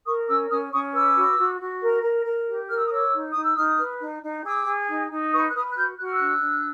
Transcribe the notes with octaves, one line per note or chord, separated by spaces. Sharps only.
A#4 C#6 D#6
C#4 D6 E6
C#4 D#6 F6
C#4 C#6 D#6
B4 D6 E6
F#4
F#4
F#4
A#4
A#4
A#4
G4
A#4 F6
E6
D#6
C#5 D6 E6
D#4
D#4 D#6
E6
D#4 D#6 F6
B4
D#4
D#4
G#4 D6 E6
G#4
D#4
D#4
B4 C#6 D#6
F#6
B4 D#6 F6
F#6
F#4 F6 G6
F#4 F#6
F6
E6 F#6
D4
D4